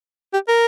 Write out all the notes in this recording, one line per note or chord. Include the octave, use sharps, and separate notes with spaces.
G4
A#4